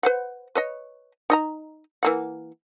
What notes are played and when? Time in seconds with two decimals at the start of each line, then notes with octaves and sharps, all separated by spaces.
0.03 B4 C5 F#5
0.55 B4 C#5 D#5
1.30 D#4 D#5 A#5
2.03 E3 A#3 F#5